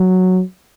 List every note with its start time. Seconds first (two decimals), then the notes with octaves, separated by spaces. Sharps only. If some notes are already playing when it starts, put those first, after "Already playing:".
Already playing: F#3